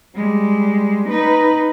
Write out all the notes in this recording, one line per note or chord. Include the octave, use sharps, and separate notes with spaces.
G3 G#3
D#4 B4